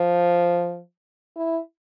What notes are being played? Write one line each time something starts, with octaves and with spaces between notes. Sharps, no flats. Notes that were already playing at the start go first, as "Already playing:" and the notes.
Already playing: F3
E4